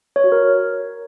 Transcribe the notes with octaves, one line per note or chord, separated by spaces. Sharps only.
C#5
F#4
A#4